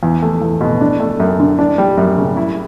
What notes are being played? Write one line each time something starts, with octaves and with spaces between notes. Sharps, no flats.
E2
A3
E2
B2
D4
A3
F#2
D3
D4
G3
F#2
C#3
E4